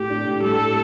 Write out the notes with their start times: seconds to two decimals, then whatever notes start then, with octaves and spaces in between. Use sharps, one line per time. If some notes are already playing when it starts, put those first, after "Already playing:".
Already playing: A2 G4
0.10 D4
0.26 A2
0.43 G3 A4
0.60 A2